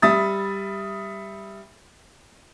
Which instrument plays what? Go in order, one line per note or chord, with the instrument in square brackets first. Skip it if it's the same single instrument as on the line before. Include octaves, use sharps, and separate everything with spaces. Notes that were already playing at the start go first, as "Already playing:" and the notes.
[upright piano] G3 E5 D#6 A6